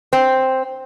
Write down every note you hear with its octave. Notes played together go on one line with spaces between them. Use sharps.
C4